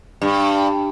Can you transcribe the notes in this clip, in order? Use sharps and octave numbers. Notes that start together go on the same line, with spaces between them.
G2